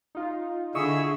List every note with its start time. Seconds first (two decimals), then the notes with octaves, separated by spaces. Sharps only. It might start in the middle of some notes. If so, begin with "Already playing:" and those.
0.15 D#4 F4
0.75 D3 E4 G#4 D#5 C#6 D#6 E6